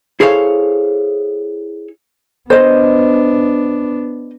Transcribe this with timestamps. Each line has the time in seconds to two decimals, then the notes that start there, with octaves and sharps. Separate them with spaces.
0.20 E4 G#4 A4 C5 C#5 F5
2.50 B3 D4 C5 D#5